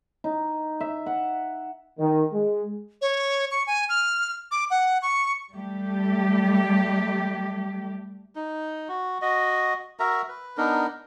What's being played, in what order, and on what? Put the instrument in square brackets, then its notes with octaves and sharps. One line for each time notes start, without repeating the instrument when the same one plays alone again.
[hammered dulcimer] D#4
E5
F#5
[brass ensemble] D#3
G#3
[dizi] C#5
C#6
G#5
F6
D6
F#5
C#6
[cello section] G3 A3 G4
[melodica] D#4
F#4
F#4 D#5
F#4 A#4 E5 A#5
B4
B3 D4 D#4 A#4